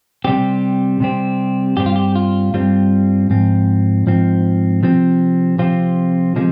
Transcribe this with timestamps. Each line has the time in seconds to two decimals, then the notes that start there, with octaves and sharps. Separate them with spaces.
0.24 C3 G3 C4 G4
1.00 C3 G3 C4
1.77 G2 G3 C4 G4
1.86 F4
1.96 G4
2.16 F4
2.53 G2 G3 C4 F4
3.30 G#2 F3 C4
4.07 G#2 F3 C4
4.83 C3 F3 C4
5.59 C3 F3 C4 F4
6.36 C3 F3 G#3